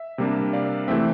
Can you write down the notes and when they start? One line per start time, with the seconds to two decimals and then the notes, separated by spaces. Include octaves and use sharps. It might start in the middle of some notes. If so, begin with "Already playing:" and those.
Already playing: E5
0.18 C3 G3 A#3 D4
0.53 D5 F5
0.88 C3 E3 A3 C4 E5 G5